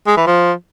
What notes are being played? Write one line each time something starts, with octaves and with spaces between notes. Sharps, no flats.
G#3
E3
F3